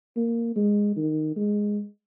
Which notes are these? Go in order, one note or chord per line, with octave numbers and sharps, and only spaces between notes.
A#3
G#3
D#3
G#3